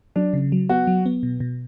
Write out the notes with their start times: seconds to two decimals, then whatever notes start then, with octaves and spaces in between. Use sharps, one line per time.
0.16 F#3 D4
0.34 C#3
0.52 F#3
0.69 B3 F#4
0.87 F#3
1.06 B3
1.23 B2
1.40 B2